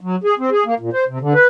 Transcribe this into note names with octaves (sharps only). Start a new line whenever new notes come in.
F#3
G#4
C4
G#4
A#3
A#2
C5
C3
D3
B4